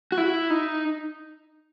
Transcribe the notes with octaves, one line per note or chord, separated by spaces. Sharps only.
F#4
E4
D#4